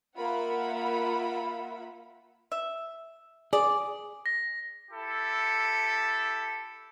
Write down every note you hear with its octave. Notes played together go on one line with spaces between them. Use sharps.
A#3 F4 E5 F#5 B5
E5
G#4 D5
A#6
E4 G4 A4